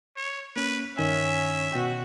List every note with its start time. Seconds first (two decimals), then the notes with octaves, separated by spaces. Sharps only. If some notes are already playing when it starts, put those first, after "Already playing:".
0.17 C#5
0.56 A#3 C#4 B4
0.98 G2 D#3 C#4 E5 G#5
1.73 B2 F#4 G5